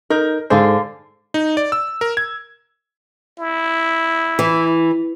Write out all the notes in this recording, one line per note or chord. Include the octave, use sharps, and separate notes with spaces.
D#4 A#4 G6
G#2 D3 G#4 C5 F5
D#4
D5
E6
A#4
G#6
E4
E3